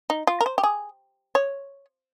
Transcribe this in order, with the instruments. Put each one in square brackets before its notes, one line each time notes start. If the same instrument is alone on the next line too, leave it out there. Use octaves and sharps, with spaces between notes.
[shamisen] D#4
F4
A#4
C5
G4
G#4
C#5